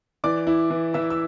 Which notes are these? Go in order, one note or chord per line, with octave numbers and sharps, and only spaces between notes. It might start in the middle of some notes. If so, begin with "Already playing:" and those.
E3 D5 D6
E4
E3
E3 E5 E6
E6